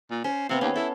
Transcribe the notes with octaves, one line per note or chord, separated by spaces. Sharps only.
A#2
C#4 C5
C3 B3 C4 F5
D#2 C#4
E4 A4